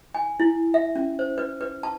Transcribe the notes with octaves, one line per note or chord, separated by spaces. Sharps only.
G#5
E4
E5
C#4
C5
B4
B4
A5